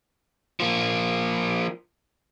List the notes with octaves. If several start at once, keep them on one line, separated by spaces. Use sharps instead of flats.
F3 A#3